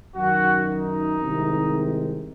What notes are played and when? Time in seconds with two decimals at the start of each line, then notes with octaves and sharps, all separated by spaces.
0.15 F#2 D#3 F#3 F#4
0.67 D#4
1.19 C2 C3 D#3 G#3